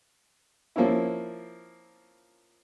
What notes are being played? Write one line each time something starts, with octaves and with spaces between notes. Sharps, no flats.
F3 A#3 C4 C#4 E4